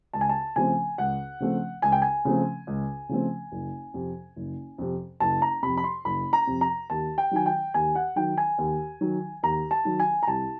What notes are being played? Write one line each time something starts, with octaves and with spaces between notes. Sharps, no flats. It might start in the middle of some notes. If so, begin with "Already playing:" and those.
C#2 A5
G#5
A5
C#3 F3 A3 C4 G#5
C#2 F#5
C#3 F3 A3 C4
C#2 G#5
G5
G#5
C#3 F3 A3 C4
C#2
C#3 F3 A3 C4
F#1
F2 C3
F#1
F2 C3
F#1 A5
A#5
F2 C3 B5
B5
C6
F#1 B5
A#5
F2 C3
A#5
D#2 A5
G5
D#3 F#3 G#5
G5
D#2 G#5
F#5
D#3 F#3 G5
G#5
D#2
D#3 F#3
D#2 A#5
A5
D#3 F#3
G#5
A#5
C2 A5